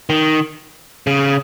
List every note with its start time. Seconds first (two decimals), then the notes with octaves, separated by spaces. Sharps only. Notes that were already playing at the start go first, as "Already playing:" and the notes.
0.09 D#3
1.07 C#3